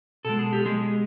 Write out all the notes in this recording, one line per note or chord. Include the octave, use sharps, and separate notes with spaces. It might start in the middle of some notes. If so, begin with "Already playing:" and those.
B2 G#3 A4
G#4
G4
G#3 G#4